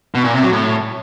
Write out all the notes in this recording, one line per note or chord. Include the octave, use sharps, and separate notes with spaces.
B2
A#2
C3
F#3
A2